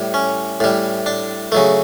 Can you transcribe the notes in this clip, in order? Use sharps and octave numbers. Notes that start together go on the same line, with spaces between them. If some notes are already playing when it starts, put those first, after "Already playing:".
Already playing: A2 G3
C#4
A2 G3
D4
C#3 F#3 A3